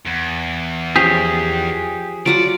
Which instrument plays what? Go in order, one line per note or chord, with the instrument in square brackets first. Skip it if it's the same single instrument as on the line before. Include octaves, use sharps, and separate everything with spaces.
[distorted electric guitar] E2
[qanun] F3 C#4 [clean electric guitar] G4 G#4
[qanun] F#3 F4 F#5 [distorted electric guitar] D5